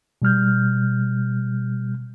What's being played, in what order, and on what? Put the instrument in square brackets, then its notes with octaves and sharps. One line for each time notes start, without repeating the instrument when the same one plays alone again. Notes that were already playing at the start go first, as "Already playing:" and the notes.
[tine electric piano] B2 G3 F6 G6